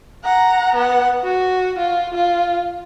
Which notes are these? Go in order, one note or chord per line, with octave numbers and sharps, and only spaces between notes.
F#5 A#5
B3 F#5
F#4
F4
F4